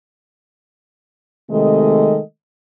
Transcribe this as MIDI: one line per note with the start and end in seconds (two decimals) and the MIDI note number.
1.51 2.19 48
1.51 2.19 51
1.51 2.19 56
1.51 2.19 57
1.51 2.19 69
1.51 2.19 75